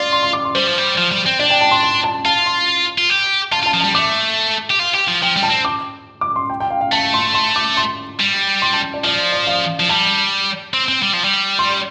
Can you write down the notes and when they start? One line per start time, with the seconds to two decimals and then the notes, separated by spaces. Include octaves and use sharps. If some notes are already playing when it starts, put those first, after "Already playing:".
Already playing: F4 D5
0.12 C6
0.23 C6
0.33 D6
0.45 C6
0.55 G3 C5
0.67 F3
0.78 G3
0.98 F3
1.11 G3
1.26 C4
1.40 D4 D5
1.50 G5
1.61 A5
1.71 C6
1.83 C6
2.04 A5
2.25 F4 A5
2.46 C6
2.98 F4
3.10 G4
3.52 F4 A5
3.63 F4
3.66 A5
3.73 F3
3.80 A5
3.84 G3
3.95 A3 D6
4.70 G4
4.79 F4
4.94 G4
5.08 F3
5.22 F3 G5
5.36 G3
5.43 A5
5.50 C4
5.65 D6
6.21 D6
6.36 C6
6.50 G5
6.60 G5
6.70 F5
6.81 F5
6.92 A3 A5
7.14 C6
7.34 C6
7.56 D6
7.77 C6
8.20 G3
8.62 C6
8.73 A5
8.94 D5
9.04 F3 D5
9.32 D5
9.47 F5
9.80 F3
9.89 G3 A5
10.74 C4
10.88 C4
11.02 G3
11.13 F3
11.24 G3
11.59 C6